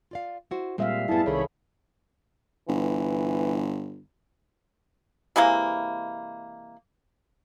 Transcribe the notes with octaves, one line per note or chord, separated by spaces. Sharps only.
F4 D5 F5
E4 F#4 C5
A#2 G3 G#3 C4 E5 F5
F#2 A2 B3 E4 G#4 A5
C2 C3 D#3 G#4 A4 C#5 B5
G1 E3
C3 E3 G#3 A#3